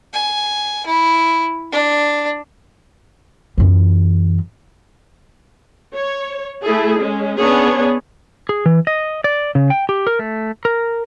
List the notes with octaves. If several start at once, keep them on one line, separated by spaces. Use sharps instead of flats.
G#5
E4
D4
F#2 E3
C#5
A3 E4 G#4 A4
G#3 C#4
B3 C#4 D4 G#4 C#5
G#4
E3
D#5
D5
C#3
G5
G4
A#4
A3
A#4